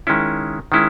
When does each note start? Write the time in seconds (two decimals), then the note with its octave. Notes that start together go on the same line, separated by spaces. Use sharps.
0.07 D#3 G#3 C#4 E4
0.72 D#3 G#3 C#4 E4